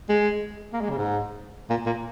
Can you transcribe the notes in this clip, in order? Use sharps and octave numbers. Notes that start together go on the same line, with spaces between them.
G#3
A#3
G#3
C#3
G#2
A#2
A#2